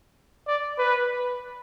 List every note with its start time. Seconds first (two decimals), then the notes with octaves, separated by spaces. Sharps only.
0.48 D5
0.79 B4